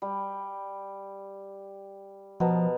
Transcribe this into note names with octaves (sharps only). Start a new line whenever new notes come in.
G3
B2 F3 A#4 A5